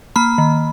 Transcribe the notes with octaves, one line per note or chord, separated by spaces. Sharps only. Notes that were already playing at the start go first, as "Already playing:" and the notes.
A#3 B5
D#3